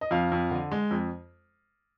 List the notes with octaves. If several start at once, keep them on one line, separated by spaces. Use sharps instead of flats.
D#5
F2 F5
F2
D3
G#3
F2